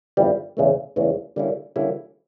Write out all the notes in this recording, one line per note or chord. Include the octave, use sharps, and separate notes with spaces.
G1 F2 E3 G3
E2 C#3 E3 A3
E2 C#3 E3 A3
D3 G3 A#3 C#4 E4
D3 G3 A#3 C#4 E4